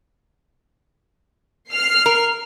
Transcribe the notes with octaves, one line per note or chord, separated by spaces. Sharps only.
F6 C7
A#4